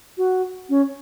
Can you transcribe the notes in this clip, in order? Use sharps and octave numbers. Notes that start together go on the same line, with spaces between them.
F#4
C#4